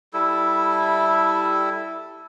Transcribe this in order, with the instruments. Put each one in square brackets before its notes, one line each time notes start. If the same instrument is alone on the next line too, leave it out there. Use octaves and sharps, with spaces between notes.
[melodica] G3 E4 A4